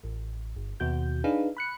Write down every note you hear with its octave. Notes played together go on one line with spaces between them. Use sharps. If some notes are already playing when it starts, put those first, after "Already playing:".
A1
G1
D#2 B2 F#4 G6
D4 D#4 G#4 B4 F5
B5 F#6 C#7